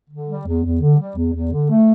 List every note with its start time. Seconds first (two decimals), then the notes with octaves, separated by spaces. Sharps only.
0.10 D3
0.28 G3
0.46 E2
0.64 E2
0.81 D3
0.98 G3
1.16 E2
1.34 E2
1.52 D3
1.69 A3